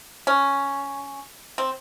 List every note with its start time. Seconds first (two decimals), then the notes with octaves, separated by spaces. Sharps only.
0.27 C#4
1.58 C4